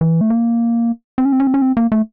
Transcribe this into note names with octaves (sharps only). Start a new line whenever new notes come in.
E3
A3
A#3
C4
C#4
C4
C#4
C4
C#4
C4
A#3
A3